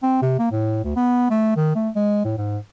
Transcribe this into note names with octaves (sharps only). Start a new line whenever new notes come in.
C4
C3
A#3
A2
D2
B3
A3
D#3
A3
G#3
A2
G#2